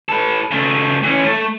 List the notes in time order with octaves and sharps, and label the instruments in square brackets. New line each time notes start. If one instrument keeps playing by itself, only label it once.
[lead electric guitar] A4 B4
C#3 A3
E3 C#4
A3